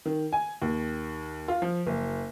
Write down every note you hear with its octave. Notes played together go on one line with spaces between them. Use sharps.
D#3
G#5
D#2
F4
F3
F#1